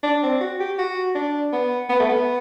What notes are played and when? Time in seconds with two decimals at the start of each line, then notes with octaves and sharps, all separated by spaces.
0.03 D4
0.23 C4
0.41 F#4
0.60 G4
0.78 F#4
1.15 D4
1.53 B3
1.90 B3
2.00 A3
2.09 B3